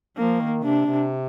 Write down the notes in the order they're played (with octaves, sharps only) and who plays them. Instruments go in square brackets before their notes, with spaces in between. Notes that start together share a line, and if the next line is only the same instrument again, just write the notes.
[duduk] F3 [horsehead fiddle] A#3
[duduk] D#3
[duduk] C3 [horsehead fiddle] D4
[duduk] C3